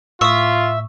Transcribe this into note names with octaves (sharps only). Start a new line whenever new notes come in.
A2 F4 E5 C#6 D#6